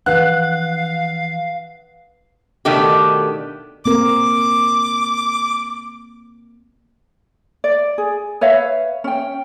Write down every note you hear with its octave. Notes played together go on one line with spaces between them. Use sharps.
E3 F3 D4 B4 F5 F#5 F#6
B2 D#3 A3 D4 G4
A#3 C4 A#4 D6
D5
G#4
B4 C#5 E5 F5
C#4 G5